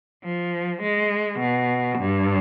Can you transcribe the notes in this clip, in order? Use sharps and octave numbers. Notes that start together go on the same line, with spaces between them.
F3
G#3
B2
G2